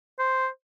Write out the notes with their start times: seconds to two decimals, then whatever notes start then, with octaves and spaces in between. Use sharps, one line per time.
0.19 C5